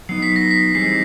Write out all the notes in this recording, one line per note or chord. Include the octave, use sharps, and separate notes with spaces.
F#3 B3 D#4 C7
B6
A#6
B6
E3 G3 C4 D#4 G#4 C7